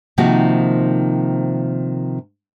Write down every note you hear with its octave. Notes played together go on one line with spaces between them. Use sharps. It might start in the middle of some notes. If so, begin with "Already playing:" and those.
C3 D#3 F3 A#3 D#4 F#4